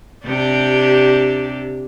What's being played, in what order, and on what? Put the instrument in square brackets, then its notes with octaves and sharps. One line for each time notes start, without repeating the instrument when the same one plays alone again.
[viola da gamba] C3 D4 G4